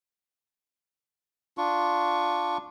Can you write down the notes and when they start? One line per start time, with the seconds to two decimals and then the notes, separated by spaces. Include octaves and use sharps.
1.58 D4 F4 C#6